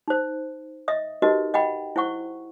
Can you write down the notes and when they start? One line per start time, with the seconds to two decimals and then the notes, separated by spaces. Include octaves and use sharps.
0.08 D#4 C5
0.88 D#5 E5 D#6
1.22 D#4 F#4 G4 A#4 B4 D#5
1.54 D#5 F#5 G5 B5
1.96 E4 C5 F#5 C#6